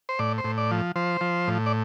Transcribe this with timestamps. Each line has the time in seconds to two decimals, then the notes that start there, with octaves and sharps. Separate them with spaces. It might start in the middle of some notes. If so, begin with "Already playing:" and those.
0.09 C5
0.19 A2 D5
0.38 C5
0.44 A2
0.58 D5
0.71 F3
0.96 F3 C5
1.21 F3
1.48 A2
1.66 D5